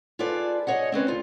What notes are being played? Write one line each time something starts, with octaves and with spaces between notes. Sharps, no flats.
F4 G#4 A4 B4 D5
G#4 C#5 D#5 F#5
C4 C#4 B4 C5
D2 F4